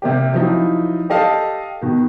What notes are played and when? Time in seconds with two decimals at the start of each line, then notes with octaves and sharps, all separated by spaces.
0.02 C3 A#3 G4
0.34 F3 F#3 D#4 E4
1.10 G4 A4 D#5 F5 A5
1.82 B2 D#3